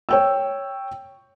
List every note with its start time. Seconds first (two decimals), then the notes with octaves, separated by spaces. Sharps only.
0.09 C#5 G5 E6